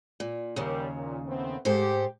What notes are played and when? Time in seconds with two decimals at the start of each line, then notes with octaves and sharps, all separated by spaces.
0.20 A#2
0.56 D#2 C#3 G3 A#4
0.94 A#2
1.26 A3 B3 C4
1.65 G#2 G4 A4 C5